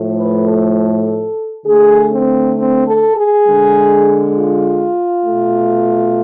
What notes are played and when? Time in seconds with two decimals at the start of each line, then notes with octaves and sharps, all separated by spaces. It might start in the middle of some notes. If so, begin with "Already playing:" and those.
Already playing: A2 F3 A3
0.16 B4
0.47 A4
0.77 A4
1.66 D3 A3 G#4
2.11 C4
2.56 C4
2.86 A4
3.16 G#4
3.46 D3 G#3
4.36 F4
5.26 B2 A3